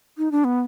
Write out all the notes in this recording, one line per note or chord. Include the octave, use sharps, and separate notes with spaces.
D#4
D4
B3